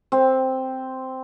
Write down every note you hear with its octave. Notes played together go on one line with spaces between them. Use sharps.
C4